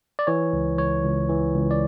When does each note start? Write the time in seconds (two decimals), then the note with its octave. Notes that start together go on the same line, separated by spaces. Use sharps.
0.19 D5
0.27 E3 C#5
0.53 C#2
0.78 C#2 C#5
1.03 C#2
1.29 E3
1.54 C#2
1.71 D5